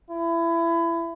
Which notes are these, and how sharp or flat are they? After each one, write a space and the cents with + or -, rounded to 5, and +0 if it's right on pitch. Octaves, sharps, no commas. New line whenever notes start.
E4 +25